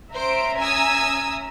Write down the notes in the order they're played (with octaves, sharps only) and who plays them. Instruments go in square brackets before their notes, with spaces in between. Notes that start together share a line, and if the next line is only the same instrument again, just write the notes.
[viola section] C#4 E5 A#5 [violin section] C5 D7
[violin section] G#5 D#6 E6